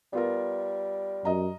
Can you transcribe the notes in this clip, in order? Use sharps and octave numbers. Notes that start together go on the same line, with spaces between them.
G3 B3 F4 A#4
F#2 D#5 A#5